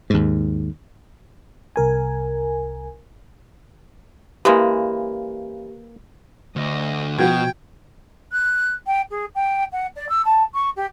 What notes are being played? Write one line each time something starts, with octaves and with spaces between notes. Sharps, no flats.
D#2 G#2
C2 A#4 G#5
C#3 E3 G#3 A#3 G4 B4
D2 D#5
B2 F3 F#4 G5 G#6
F#6
G5
G#4
G5
F#5
D5
E6
A5
C#6
G4